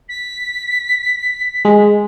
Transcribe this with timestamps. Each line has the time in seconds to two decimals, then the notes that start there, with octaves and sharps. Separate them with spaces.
0.08 B6
1.65 G#3